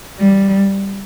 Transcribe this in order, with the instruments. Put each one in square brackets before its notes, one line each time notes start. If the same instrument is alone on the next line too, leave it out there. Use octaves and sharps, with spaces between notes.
[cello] G3